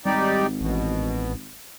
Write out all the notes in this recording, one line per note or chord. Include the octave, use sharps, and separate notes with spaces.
G#1 G3 D#4 G4 D5
A1 B2